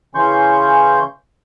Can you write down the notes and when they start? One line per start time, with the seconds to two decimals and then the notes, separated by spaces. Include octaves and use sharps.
0.15 C#3 E3 C#4 C6 C#6 G6